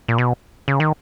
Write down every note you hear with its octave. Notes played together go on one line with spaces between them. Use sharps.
A#2
B2
C#3
D#3